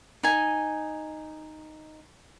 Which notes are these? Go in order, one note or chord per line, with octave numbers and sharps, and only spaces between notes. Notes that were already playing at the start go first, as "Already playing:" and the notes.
D#4 G#5